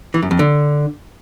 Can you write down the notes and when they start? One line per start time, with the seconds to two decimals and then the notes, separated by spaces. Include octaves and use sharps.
0.14 E3
0.22 F#2
0.31 F2
0.39 D3